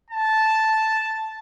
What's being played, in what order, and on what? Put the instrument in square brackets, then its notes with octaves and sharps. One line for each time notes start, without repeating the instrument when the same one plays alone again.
[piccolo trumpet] A5